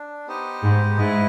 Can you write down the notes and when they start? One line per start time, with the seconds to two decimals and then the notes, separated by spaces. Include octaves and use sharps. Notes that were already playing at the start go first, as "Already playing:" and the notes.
Already playing: D4
0.27 B3 D#4 G4 C5 D#5
0.63 G#2
0.98 G#2 E4 G#4 B4 D#5